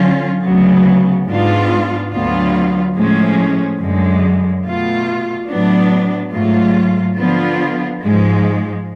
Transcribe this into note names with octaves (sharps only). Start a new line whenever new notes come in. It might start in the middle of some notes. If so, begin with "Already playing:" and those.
Already playing: D3 F#3 C#4 F4
D2 C#3 F#3 B3
G#2 G#3 B3 D4 F4
D2 D3 F#3 B3 F4
A2 F3 G#3 C#4
F#2 D3 G#3
B2 A3 F4
A2 F#3 B3 D4
G#2 F#3 A3 F4
D3 F3 B3 F4
G#2 F3 G#3